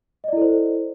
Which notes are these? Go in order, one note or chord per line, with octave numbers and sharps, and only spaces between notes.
E4 A4 C5 D5 D#5